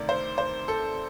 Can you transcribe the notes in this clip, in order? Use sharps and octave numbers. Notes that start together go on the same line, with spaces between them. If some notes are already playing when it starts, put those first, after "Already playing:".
Already playing: D2 C3 D#3 D5
C5
C5
A4